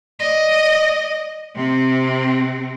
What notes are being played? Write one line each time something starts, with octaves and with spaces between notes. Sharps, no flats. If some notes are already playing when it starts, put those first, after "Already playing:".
D5 D#5
C3 C4